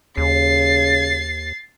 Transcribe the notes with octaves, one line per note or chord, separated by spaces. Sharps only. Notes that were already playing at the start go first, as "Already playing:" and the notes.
D#2 C#3 A6 C7